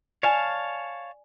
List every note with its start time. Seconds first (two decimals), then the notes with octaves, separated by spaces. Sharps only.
0.23 C#5 D5 F5 G#5 A5